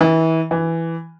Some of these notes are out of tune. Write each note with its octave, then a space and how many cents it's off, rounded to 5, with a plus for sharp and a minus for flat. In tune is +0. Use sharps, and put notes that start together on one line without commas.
E3 -30
E3 +0